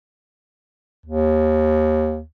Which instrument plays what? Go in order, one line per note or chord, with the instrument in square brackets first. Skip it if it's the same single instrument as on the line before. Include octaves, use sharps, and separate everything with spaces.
[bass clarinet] D#2